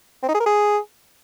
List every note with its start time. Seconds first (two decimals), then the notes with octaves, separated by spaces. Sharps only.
0.23 C4
0.29 D#4
0.34 G#4
0.40 A#4
0.46 G#4